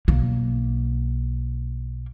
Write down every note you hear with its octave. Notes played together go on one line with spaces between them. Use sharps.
B1 A#3